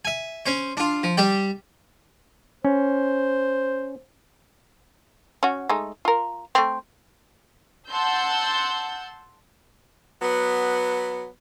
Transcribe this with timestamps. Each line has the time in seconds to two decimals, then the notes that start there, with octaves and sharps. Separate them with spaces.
0.05 E5 G#5
0.46 C#4 C5
0.77 D4 F4
1.03 F3
1.17 G3 G4 D5 G5
2.65 C#4 C5
5.43 C#4 F#4
5.69 G#3 A3 D#4
6.05 F4 A#4
6.55 A3 C4
7.88 F#5 A5 C6 E6 G6
10.22 F#3 B3